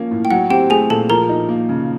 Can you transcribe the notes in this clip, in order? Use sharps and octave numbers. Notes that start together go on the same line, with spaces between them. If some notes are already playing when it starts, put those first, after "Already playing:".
Already playing: F3 A#3 C#4
A2
G5
F#3 F#5
C4 G4 G5
A3 G#4 G#5
A#2 A4 A5
F3 A#4 A#5
D#4
A#3
C#3